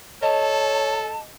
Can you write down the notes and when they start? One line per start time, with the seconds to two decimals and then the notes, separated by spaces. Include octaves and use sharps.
0.22 A4 C#5 D#5 A5